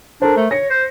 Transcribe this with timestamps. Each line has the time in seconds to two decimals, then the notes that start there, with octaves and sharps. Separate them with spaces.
0.22 D4 A4 A#4 C5
0.37 A3
0.51 C#5 A#6 C#7
0.70 C5